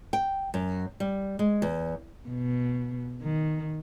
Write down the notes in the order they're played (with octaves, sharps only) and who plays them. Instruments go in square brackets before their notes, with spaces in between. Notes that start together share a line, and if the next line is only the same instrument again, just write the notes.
[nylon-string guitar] G5
F#2
G3
G#3
E2
[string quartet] B2
D#3